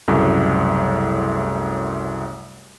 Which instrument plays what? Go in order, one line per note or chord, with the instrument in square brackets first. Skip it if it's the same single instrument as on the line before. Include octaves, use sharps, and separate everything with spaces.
[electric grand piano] C2 F#2 A2 C#3 A3